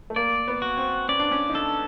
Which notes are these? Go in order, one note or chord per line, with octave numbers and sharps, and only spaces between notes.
A3
A#3 D5
B3
F#4
C4
C#4 D5
D4
C#4
D#4
D4 A4